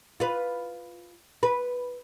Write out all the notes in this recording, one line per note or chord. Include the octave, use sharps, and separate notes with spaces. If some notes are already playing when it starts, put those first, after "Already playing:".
F4 B4
B4